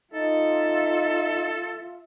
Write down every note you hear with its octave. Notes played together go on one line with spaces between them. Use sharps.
D#4 F4 A4 E5